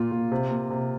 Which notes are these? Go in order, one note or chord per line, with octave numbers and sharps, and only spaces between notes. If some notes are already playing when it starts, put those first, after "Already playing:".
Already playing: A#2 A#3 F4
A#2
C3
A#3
C3